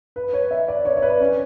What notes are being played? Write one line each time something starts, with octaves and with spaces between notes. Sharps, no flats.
B4
C#5
E5
D5
C#5
C#5
B4
C#4